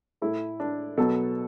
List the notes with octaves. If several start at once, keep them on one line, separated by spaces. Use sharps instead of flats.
A2 A3 E4
D4
B2 F#3 B3 A4